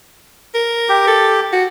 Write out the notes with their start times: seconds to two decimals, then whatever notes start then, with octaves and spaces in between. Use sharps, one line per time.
0.54 A#4
0.89 G4
1.08 A4
1.53 F#4